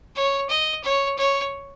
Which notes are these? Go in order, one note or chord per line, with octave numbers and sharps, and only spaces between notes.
C#5
D#5
C#5
C#5